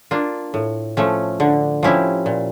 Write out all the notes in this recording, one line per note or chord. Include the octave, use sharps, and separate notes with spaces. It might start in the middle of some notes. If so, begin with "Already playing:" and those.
A#3 D4 F4
A2
F3 A3 C#4
D3
F3 C#4 E4 G4
A#2